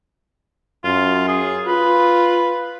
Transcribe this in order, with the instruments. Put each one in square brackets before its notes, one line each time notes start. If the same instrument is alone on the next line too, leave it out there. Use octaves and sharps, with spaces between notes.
[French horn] F#2 [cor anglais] F4
[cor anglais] G#4
[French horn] F4 [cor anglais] B4